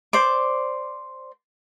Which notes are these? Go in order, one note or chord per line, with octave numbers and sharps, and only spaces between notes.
C5 D5 D6